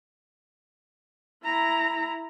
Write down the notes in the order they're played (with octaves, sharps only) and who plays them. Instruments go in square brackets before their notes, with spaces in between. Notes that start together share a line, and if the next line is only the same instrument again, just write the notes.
[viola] E4 A#5